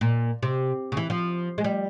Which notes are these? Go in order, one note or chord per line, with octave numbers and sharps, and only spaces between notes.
A#2
C3
C#3
E3
F3
G#3
G3